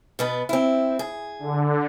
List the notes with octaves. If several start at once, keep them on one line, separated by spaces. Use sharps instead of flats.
B2 B3 B4
C4 E4
G#4
D3